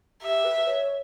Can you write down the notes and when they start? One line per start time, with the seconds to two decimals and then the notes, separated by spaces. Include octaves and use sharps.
0.23 G4 E5
0.45 B4
0.67 C#5